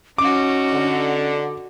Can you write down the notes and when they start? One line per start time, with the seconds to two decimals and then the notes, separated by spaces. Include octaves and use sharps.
0.18 C#4 D#4 F#4 D6
0.73 D3